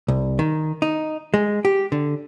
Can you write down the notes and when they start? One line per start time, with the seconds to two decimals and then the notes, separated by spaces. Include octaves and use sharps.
0.08 C2
0.39 D#3
0.82 D#4
1.34 G#3
1.65 G4
1.92 D3